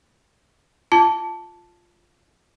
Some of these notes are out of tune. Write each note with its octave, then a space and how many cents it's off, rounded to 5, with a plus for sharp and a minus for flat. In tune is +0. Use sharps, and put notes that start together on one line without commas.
F4 +0 A5 +0